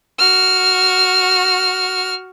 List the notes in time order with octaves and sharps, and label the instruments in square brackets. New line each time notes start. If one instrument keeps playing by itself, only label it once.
[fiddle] F#4 F6